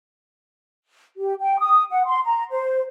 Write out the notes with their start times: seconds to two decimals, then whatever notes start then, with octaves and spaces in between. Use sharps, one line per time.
1.18 G4
1.40 G5
1.59 D#6
1.91 F#5
2.06 C6
2.24 A#5
2.51 C5